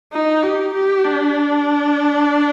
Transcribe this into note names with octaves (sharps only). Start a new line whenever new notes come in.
D#4
G4
G4
D4